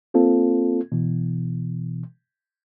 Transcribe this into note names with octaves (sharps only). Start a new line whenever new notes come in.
A#3 C4 F4 A4
B2 E3